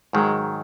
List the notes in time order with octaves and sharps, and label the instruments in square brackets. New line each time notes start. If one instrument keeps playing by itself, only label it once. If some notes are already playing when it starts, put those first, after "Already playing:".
[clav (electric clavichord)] G#2 D#3 F#3 [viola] G#3